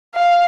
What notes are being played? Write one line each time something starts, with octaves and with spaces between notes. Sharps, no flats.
F5